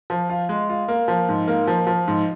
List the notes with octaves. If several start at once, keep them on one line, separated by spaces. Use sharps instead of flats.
F3
F4
G#3
F4
A#3
F3
G#2
A#3
F3
F3
G#2